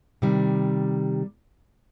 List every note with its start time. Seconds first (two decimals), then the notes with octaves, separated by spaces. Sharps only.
0.22 C3 D#3 G3